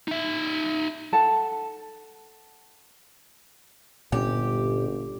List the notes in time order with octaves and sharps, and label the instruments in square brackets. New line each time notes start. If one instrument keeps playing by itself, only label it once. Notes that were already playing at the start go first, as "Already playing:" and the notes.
[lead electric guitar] D#4 E5
[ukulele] A4 F#5 A5
[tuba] G1 [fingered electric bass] A#2 C#4 [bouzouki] G4